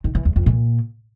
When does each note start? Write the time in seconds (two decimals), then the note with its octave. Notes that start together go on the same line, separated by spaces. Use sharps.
0.04 D#3
0.15 E3
0.25 E2
0.36 F2
0.46 A#2